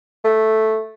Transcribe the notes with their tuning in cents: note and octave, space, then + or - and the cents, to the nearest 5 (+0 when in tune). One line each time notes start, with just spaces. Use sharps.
A3 -5